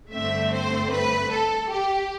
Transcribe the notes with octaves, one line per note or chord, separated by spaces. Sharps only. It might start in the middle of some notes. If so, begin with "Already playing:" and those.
G2 D3 A3 C4 E5
C5
B4
A4
G4